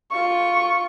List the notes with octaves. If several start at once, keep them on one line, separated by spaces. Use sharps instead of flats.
F4 C#6